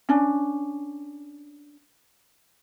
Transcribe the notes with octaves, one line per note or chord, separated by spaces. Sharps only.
C#4 D4